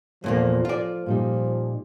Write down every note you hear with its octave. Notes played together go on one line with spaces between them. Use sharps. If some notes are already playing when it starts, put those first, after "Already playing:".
E2 A#2 F3 A3 A#3
F3 F4 D5
A#2 F3 G3 D#4